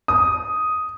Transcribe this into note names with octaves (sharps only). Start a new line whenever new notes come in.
D#6